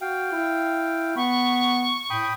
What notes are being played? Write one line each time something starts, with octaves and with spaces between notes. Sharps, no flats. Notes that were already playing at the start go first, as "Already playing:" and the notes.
F#4 F5 G5
E4
B3 B5 C#6
A2 G5 B5 D#6